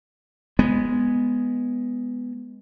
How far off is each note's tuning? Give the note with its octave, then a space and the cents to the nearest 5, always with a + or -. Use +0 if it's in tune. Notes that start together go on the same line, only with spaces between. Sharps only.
G#3 +0 B3 +0